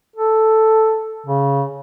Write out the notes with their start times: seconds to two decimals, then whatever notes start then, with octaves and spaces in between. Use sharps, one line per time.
0.16 A4
1.26 C#3